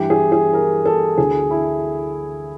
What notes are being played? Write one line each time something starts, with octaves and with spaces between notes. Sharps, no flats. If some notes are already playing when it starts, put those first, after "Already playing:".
Already playing: G2 E3 G4
G#4
G#4
A#4
A4
D2 D3 G#4
E4